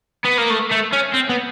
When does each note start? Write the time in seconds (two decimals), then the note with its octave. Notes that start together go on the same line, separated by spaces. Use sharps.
0.24 B3
0.38 A#3
0.50 A3
0.71 A3
0.92 C#4
1.14 C4
1.29 B3